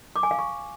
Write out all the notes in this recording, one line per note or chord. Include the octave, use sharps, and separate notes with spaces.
D6
G#5
F5
C#6